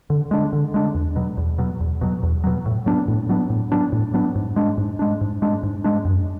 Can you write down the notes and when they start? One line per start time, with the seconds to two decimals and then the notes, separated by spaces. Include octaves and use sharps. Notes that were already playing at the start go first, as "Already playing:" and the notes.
0.10 D3
0.31 G#3 D4
0.53 D3
0.74 G#3 D4
0.95 E2
1.16 B2 F#3
1.38 E2
1.58 B2 F#3
1.80 E2
2.01 B2 F#3
2.23 E2
2.44 B2 F#3
2.66 A2
2.86 F#3 B3 D4
3.08 A2
3.29 F#3 B3 D4
3.50 A2
3.72 F#3 B3 D4
3.92 A2
4.14 F#3 B3 D4
4.35 G#2
4.56 G#3 D4
4.78 G#2
4.99 G#3 D4
5.21 G#2
5.42 G#3 D4
5.63 G#2
5.84 G#3 D4
6.05 F#2